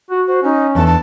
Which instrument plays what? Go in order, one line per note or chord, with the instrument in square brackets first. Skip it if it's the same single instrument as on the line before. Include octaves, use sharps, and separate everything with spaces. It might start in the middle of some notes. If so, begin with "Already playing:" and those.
[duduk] F#4
[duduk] F#4 [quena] C5
[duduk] C#4 [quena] D#4
[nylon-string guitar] E2 D4 A4 [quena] A5
[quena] A5